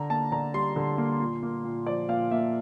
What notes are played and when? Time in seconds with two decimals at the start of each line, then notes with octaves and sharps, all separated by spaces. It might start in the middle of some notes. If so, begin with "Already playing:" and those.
Already playing: D3 A#5
0.10 A#3 A5
0.32 D3 A#5
0.54 G3 C6
0.76 D3
0.98 A#3
1.20 A#2
1.43 A#3
1.65 A#2
1.87 F3 D5
2.09 A#2 F5
2.31 A#3 E5